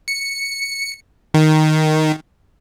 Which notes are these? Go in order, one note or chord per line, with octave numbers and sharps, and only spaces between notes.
C#7
D#3